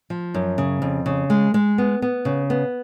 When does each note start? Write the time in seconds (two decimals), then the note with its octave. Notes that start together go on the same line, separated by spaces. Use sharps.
0.10 F3
0.34 F#2
0.58 C#3
0.82 F2
1.06 C#3
1.30 G#3
1.54 G#3
1.78 B3
2.02 B3
2.25 C#3
2.50 B3